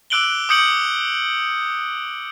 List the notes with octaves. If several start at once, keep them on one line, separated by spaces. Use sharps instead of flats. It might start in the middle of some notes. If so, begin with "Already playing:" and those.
D6 E6 F#6 D7 F#7 G7
D6 D#6 G6 C#7 D7 F#7